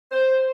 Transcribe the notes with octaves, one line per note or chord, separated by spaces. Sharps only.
C5